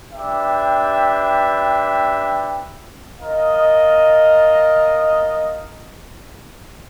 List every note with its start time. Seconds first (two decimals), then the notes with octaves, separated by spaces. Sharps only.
0.12 D4 G4 B4 E5 G5
3.20 F4 A#4 D#5